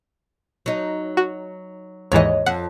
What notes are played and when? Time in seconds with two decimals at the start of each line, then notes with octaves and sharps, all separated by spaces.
0.66 F#3 D#4
1.17 F#4
2.12 D#2 G#2 E3 C#5 D#5
2.46 F2 F#5